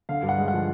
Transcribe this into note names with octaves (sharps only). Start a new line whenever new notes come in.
D3 F5
G2
F#5
G#3
F#5
F3